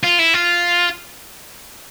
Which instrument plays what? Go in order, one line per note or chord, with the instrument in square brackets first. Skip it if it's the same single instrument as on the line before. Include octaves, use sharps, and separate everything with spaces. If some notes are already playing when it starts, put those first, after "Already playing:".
[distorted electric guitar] F4
E4
F4